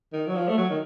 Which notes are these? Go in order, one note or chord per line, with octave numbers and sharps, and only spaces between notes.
D#3
F#3
F3
A3
F#3
D#3